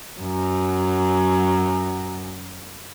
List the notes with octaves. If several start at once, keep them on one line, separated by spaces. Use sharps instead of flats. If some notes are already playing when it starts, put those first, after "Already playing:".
F#2 F#3